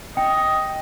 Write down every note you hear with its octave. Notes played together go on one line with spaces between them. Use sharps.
D#5 G5